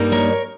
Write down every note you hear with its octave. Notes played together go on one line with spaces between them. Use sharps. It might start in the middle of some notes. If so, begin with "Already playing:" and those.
Already playing: G2 G3 A#3 D#4
A#4 C#5